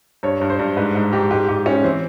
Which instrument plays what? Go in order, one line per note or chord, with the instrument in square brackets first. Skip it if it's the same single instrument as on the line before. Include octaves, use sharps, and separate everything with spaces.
[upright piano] G2 C#5
G2
C5
G2
G#2 B4
G#2
G#2 G4
G#2 G4
G#2 G4
G#2 C#4
E3 C4